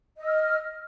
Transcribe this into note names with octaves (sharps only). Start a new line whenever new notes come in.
D#5 E6 F6